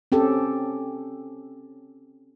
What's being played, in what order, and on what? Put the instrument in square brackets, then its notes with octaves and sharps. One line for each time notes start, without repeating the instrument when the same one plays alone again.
[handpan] C4 C#4 G4 A4